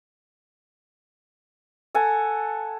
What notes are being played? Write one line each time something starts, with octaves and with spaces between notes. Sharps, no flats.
A4 F#5 G#5